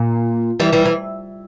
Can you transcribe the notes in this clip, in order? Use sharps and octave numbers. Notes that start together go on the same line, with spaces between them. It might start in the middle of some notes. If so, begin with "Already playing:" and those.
Already playing: A#2
E3 G3
E3 G3
E3